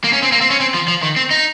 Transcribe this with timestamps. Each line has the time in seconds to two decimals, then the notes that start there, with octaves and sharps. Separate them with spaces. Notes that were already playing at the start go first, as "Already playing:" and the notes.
0.04 A#3
0.13 C#4
0.23 C4
0.32 A#3
0.41 C4
0.51 C#4
0.60 C4
0.74 F3
0.88 F3
1.03 D#3
1.16 C4
1.31 D#4